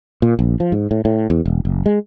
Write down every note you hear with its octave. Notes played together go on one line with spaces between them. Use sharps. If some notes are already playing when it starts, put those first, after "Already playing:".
A#2
A#1
F3
G#2
A2
A2
E2
E1
F#1
G#3